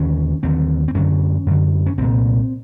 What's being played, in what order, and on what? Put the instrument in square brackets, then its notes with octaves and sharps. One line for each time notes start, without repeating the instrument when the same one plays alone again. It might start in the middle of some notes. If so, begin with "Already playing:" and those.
Already playing: [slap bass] D#2 D3 C#4
D#2 D3 C4
C4
F#2 D3 C#4
F#2 D3
C#4
C2 A#2 C4